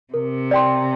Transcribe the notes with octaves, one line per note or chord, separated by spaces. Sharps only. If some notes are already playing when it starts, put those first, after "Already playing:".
C3 A#4
D5 G5 C6